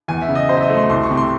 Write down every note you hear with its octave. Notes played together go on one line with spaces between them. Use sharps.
E2 G#5
E5
C#3
D#5
F#3 C5
E5
D#5
A3
C6
C2 C6
C#6
C3
C6